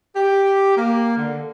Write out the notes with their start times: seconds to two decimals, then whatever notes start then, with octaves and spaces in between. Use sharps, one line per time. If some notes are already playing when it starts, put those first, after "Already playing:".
0.15 G4
0.77 A#3
1.17 D3